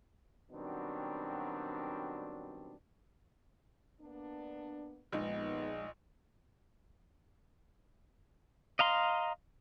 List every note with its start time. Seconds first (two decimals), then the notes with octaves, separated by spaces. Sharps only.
0.51 B2 D#3 F#3 G3 C4 D4
4.01 A#3 B3 D4
5.13 A#1 D#2 G#3 B3 D#4 D#5
8.79 D#5 F5 A#5 C6